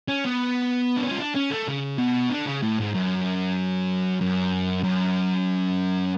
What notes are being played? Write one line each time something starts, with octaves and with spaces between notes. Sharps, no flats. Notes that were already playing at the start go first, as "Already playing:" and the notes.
C#4
B3
D4
C#4
F4
D4
C#4
A3
C#3
B2
D3
C#3
A2
G#2
F#2
F#2
F#2